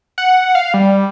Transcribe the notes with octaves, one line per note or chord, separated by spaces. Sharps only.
F#5
F5
G3